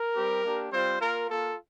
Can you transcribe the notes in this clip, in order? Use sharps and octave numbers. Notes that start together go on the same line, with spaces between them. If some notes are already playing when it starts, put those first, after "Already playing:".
Already playing: A#4
G3 C4 G4
A#3 D4 G4
G3 C4 F4 C5
A#3 F4 A#4
A#3 F4 A4